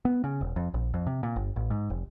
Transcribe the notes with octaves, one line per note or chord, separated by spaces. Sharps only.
B3
C#3
E1
F2
A#1
F2
C3
A#2
G1
A1
G#2
F1